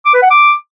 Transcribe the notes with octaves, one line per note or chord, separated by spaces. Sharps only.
D6
B4
F#5
D6